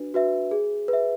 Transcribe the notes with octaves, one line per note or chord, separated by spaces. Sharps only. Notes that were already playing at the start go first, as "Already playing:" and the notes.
Already playing: D4 F#4 B4
F#4 B4 E5
G#4
B4
E5